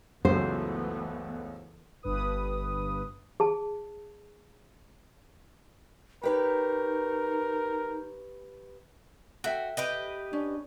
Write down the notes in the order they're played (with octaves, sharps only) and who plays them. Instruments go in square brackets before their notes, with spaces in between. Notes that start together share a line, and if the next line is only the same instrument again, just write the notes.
[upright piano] C#2 F#2 [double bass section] E3 A3 B3 [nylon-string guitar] C5
[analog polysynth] G1 G2 B4 D#6
[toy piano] G#4 A5
[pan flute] D#4 [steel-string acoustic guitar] G4 B4 C#5 [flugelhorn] A#4
[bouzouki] F#4 [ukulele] A4 E5 G5
[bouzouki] G4 B4 D#5
[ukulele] C#4 [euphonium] D4